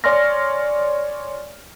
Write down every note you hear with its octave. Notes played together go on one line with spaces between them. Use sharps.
C#5 D5 G#5 C6 F6 A#6